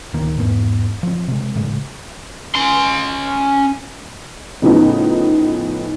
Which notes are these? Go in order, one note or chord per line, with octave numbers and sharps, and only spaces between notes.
D1 D#3 A#3
E2 G#2 B3
F3 C4
C3 G#3
A2 C#3 G#3
C#4 C6
A2 C#3 F3 B3 D#4